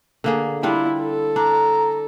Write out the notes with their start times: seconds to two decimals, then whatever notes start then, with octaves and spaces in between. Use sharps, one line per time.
0.24 D3 A#3 G#4
0.63 G3 D4 E4 F4
1.00 A4
1.36 D4 A#5